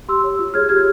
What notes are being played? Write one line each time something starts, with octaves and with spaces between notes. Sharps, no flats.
G4 C6 E6
C#5
F4
G#4 C#5 F6 G#6
G4 F6 G#6